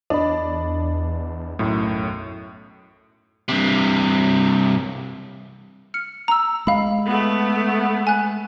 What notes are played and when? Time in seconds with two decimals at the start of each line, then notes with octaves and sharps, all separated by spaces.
0.10 E2 D4 D#5 B5
1.59 B1 F#2 A2
3.49 G2 C3
5.94 F6 C#7
6.28 A#5 E6
6.67 G#3 F5 B5
7.06 A3 B3
8.07 G#5 F#6